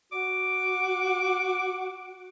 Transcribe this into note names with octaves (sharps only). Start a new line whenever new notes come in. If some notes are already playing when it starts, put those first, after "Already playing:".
F#4 D6